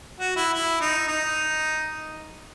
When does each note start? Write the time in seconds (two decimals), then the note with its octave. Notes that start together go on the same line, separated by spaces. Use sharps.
0.19 F#4
0.36 E4
0.54 E4
0.81 D#4
1.08 D#4